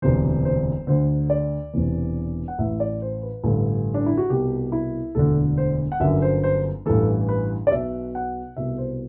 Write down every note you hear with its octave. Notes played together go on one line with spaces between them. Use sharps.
E1 D2 C3 E3 C5
C5
D2 D3 C5
D5
E1 E2 C3 E3
F#5
A1 A2 E3 E5
D5
C5
B4
A1 G2 D3 A4
D4
E4
F#4
C2 B2 G4
E4
E1 D2 D3 A4
C5
F#5
G1 F#2 D3 E5
C5
C5
A1 G2 E3 A4
B4
D5
B1 B2 E5
F#5
C2 B2 E5
C5